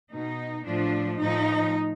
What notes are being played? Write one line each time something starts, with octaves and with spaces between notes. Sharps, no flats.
B2 D#4
A2 F3 D4
A2 F3 D#4